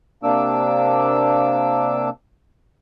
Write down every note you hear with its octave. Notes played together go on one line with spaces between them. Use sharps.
C3 A#3 D4 D6 E6